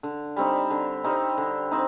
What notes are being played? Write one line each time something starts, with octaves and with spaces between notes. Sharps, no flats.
D3
G3 C4 D#4
D3
G3 C4 D#4
D3
C4 D#4